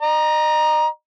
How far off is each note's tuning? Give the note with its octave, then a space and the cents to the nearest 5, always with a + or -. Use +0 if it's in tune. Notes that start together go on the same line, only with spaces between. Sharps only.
D#5 -35 A#5 +15